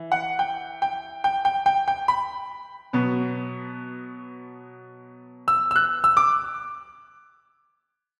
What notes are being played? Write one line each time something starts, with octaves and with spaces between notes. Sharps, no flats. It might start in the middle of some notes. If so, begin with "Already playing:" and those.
Already playing: E3
F#5
G5
G5
G5
G5
G5
G5
B5
B2 F#3 B3
E6
E6
F#6
E6
D6